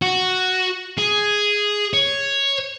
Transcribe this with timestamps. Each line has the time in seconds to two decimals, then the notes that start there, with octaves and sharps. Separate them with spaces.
0.02 F#4
0.97 G#4
1.93 C#5